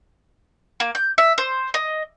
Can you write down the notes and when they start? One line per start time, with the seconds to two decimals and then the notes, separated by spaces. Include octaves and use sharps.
0.80 A#3
0.95 G6
1.18 E5
1.38 C5
1.74 D#5